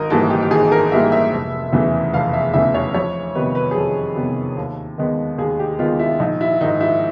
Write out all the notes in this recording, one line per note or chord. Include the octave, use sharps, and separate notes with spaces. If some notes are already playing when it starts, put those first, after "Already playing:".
Already playing: G#1 A#4 D#5
G#2 E3 G3 A#3 A4
G4
G4
G#1 G#4
A4
A#4
G#2 E3 G3 A#3 E5
E5
F1
E2 C#3 E3 A3
F1 F5
E5
E2 C#3 E3 A3 E5
C#5
F2 C#5
C3 D#3 G3 B3 B4
B4
G#4
F2 A4
C3 D#3 G3 B3
D#2
D#3 G#3 B3
D#2 G#4
G4
D#3 G#3 B3 F4
E4
A#1 D#4
E4
G#2 D#3 D#4
E4